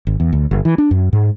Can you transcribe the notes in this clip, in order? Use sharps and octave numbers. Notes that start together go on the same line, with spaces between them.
G#1
E2
D2
G1
E3
D4
F#2
G#2